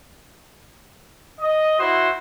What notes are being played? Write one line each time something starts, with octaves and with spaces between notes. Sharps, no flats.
D#5
E4 F#4 C5